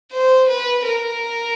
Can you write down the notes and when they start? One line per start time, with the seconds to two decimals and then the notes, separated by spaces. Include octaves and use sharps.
0.11 C5
0.49 B4
0.85 A#4